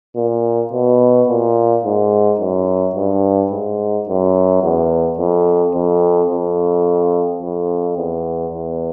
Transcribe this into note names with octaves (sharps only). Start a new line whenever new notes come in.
A#2
B2
A#2
G#2
F#2
G2
G#2
F#2
E2
F2
F2
F2
F2
E2
E2